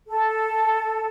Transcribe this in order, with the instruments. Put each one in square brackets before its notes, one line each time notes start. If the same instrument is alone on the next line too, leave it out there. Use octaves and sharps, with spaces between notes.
[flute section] A4